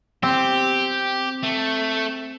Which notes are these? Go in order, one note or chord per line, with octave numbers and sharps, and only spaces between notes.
C4 G4
A3